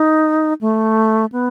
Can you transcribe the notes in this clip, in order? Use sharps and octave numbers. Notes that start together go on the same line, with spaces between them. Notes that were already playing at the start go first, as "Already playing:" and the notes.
Already playing: D#4
A3
B3